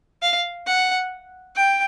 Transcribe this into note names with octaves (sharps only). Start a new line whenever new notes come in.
F5
F#5
G5